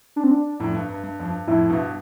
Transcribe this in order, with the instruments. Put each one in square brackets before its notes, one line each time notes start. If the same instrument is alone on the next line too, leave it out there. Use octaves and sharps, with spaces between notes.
[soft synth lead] D4
C4
D4
[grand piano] F2 A2
G2
G2
G2
F2
G2
[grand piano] F2 A2 [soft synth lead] E4
[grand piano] G2 B2